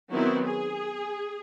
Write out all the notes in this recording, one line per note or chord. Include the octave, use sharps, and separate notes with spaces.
D#3 F#3 B3 C4 E4
G#4